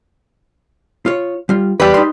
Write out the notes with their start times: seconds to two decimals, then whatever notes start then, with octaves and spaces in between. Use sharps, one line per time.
1.06 F4 C#5
1.49 G3 F4
1.80 E2 G3 B4
1.94 D#4 C6